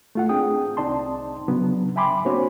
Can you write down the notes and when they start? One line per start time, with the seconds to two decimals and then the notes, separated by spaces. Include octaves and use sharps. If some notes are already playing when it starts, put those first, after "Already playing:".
0.15 A3 F4 F#5
0.29 C4 D4 G#4 G5 D#6
0.77 C2 C4 D#4 D5 A5 C6
1.48 C#3 F#3 B3 D4
1.96 E5 G5 G#5 B5 C6 D6
2.25 A#3 C4 D4 F#4 C5 C#5